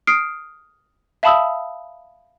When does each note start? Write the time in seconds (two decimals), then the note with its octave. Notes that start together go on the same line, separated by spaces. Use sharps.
0.07 D#6 F6 C7 D7
1.23 E5 F5 A5 B5 D#6 E6